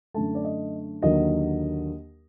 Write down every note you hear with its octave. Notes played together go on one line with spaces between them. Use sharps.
F#2 D3 A3 A5
D5
D#5
D#2 D3 F#3 A#3 D#5